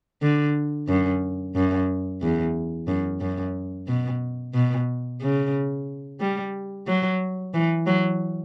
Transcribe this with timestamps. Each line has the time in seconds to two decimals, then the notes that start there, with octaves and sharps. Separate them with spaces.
0.22 D3
0.88 F#2
1.56 F#2
2.22 E2
2.88 F#2
3.21 F#2
3.88 B2
4.54 B2
5.22 C#3
6.20 G3
6.88 F#3
7.54 E3
7.87 F#3